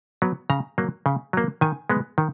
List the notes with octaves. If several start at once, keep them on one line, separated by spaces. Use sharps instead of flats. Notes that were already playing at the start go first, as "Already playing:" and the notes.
F#3 B3
C#3 A#5
F#3 A#3
C#3
F#3 A#3
D#3 G#5
G#3 B3
D#3